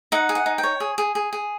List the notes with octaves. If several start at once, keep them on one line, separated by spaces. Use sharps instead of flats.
D#4 F#5
G#4
F#5
D#4
G5
C#5
G#4
G#4
G#4
G#4